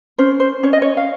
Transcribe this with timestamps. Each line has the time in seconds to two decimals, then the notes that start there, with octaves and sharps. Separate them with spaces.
0.18 C#4 C5
0.40 C5
0.63 C#4 C#5
0.73 D#5
0.82 C#5
0.97 F5